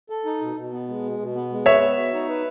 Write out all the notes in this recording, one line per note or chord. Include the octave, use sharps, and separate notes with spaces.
A4
D#4
B2
B2
B3
G#3
B2
B2
B3
G#3
B4 C#5 E5
B3
F#4
D#4
B4